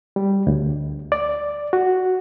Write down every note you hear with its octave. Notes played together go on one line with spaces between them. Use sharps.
G3
D2
D5
F#4